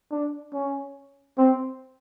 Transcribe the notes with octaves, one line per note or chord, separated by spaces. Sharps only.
D4
C#4
C4